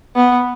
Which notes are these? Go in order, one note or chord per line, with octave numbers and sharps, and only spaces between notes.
B3